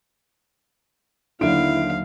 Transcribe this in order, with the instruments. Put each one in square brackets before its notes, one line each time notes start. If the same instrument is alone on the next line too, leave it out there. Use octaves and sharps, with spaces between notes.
[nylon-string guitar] D#2 F#3 E5 [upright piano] D3 D7 [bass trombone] E4 [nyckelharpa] F5